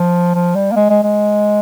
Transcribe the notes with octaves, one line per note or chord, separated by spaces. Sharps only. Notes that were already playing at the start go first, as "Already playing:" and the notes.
Already playing: F3
F3
G3
A#3
G#3
G#3
G#3